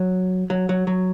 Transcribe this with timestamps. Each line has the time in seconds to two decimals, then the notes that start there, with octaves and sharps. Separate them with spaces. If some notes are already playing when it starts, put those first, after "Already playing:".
Already playing: F#3
0.50 F#3
0.69 F#3
0.87 F#3